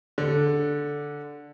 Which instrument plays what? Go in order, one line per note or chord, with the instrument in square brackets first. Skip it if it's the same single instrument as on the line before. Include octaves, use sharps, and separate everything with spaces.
[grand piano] D3